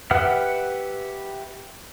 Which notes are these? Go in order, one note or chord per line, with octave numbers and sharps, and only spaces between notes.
G4 B4 E5 F#5 F6